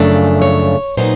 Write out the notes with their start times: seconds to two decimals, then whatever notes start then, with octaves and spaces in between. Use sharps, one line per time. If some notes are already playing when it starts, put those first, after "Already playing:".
Already playing: F#2 C#3 F3 A3 D4
0.42 C#5
0.97 A#2 F#3 B3 D#4 C5